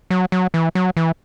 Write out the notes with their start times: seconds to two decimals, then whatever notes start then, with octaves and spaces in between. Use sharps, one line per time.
0.10 F#3
0.32 F#3
0.54 E3
0.75 F#3
0.97 E3